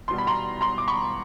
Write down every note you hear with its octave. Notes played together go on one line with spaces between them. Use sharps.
E2 B2 G3 C6
B5
A#5 C6
A#5 C6
D6
B5 C#6